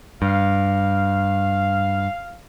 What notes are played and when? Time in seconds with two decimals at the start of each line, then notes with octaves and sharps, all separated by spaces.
0.22 G2 F5